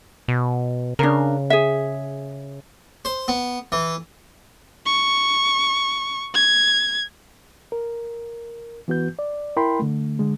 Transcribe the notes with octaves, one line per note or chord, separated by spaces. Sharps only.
B2
C#3 D4 A#4
G#4 E5
C5
B3
E3
C#6
G#6
A#4
E3 B3 F#4 B4 G6
D5
E4 A#4 G5 B5 C6
D3 A3
D3 G#3